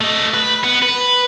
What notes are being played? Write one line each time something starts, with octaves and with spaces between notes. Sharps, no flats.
A3 D#5
B4
B3
B4